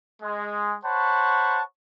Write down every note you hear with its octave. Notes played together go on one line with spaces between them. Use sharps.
G#3
C5 C#5 F#5 A5 B5 C#6